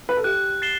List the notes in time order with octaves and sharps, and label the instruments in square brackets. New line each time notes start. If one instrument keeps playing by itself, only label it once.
[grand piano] B4
A4
[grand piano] G4 [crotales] F#6
[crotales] A6 C7 E7 G7